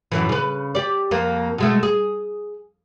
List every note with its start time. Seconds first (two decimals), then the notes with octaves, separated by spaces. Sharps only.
0.12 F#2 A2 E3
0.29 C#3 B4
0.75 G4 D5
1.11 F2 A#3
1.58 B2 G#3 A3
1.83 G#4